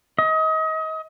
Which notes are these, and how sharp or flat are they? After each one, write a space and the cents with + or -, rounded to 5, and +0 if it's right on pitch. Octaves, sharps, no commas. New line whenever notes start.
D#5 +30